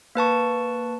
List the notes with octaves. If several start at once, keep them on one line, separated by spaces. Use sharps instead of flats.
A#3 B4 A5 C#6